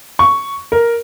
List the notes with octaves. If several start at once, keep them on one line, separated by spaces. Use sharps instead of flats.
C#6
A#4